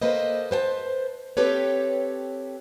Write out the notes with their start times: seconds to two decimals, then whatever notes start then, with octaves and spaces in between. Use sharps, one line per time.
0.02 A#3 A4 B4 C5 D#5
0.51 B4 C5 G5 A5
1.37 C4 G4 A4 B4 C#5